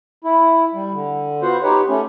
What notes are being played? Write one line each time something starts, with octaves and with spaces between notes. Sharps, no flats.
E4
G3
D3
B3 F4 F#4 C5 F#5
D#4 G4 B4 C#5
A3 C#4